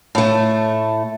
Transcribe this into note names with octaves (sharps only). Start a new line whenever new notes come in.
A2 A3